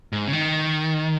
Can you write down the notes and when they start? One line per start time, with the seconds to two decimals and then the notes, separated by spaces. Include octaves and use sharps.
0.13 G#2
0.28 C#3
0.33 D#3